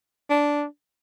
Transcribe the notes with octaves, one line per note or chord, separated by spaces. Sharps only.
D4